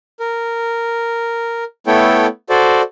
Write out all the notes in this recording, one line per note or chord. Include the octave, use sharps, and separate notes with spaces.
A#4
A3 B3 E4 A4 C#5 G5
F#4 A4 C5 D5